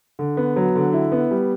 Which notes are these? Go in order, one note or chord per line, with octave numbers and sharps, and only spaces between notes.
D3
B3
F#3
D3
E4
B3
G3